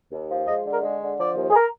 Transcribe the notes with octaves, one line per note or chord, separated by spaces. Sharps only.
D#2
F3
G#3 D#5
D3
A#4
G#3
D3
F3 D5
D#2
G#4
A#4